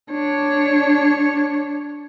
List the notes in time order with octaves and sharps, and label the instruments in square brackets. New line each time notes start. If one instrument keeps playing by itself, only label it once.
[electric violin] D4 C#5